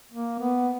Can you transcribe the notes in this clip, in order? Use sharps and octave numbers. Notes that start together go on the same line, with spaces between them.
A#3
B3